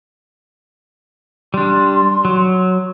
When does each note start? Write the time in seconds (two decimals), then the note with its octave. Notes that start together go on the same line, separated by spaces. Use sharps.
1.54 G3 D4 C6
2.25 F#3